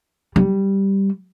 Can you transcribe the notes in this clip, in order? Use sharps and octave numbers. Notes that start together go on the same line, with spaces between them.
G3